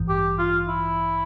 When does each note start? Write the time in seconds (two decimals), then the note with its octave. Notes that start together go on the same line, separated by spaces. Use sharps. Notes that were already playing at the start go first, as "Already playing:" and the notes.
Already playing: A1 G2 E3
0.09 G4
0.39 F4
0.68 E4